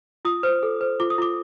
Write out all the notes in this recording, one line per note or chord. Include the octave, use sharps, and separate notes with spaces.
F4 D#6
C5
A4
C5
F4 D6
D#6
F4 D6